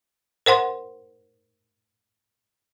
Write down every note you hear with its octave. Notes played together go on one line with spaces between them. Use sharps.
A#4 C5 F#5 C6